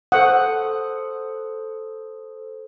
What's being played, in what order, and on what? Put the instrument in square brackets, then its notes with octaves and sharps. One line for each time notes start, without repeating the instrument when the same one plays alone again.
[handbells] A4 C5 D#6 [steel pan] F#5